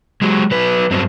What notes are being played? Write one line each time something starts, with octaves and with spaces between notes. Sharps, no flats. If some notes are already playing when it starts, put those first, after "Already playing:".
F#3 G#3
F#3 B4
G2 F#3 C4